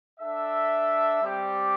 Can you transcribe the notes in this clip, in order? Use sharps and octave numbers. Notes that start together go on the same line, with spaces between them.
D4 A4 E5
G3 C4 G4 D5